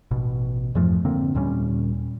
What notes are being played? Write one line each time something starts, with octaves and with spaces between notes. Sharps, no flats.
A1 B2
F2 G#2 F3 A3
D3 A#3 C4
D#2 A#2 G3 C#4